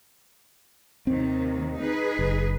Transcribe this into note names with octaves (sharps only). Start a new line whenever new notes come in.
D#2 C3 D#3 C4
D#4 G#4 B4
F#1